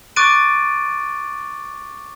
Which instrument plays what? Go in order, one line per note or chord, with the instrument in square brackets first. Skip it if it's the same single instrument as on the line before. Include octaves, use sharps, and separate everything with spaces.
[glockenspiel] C#6 D6 F#6 A6 D7 D#7